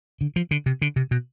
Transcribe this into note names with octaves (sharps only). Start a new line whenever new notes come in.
D3
F3
D3
C3
D3
C3
B2